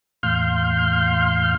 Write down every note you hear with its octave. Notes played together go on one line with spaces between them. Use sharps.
E2 A2 F5 C6 F6 G6